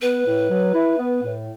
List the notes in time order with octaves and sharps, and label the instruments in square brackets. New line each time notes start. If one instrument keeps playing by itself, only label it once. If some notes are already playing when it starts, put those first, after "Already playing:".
[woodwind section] B3 [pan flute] B4
[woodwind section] A2
F#3
E4
B3
A2